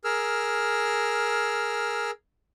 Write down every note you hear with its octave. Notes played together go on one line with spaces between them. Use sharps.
G#4 A#4 E6 F6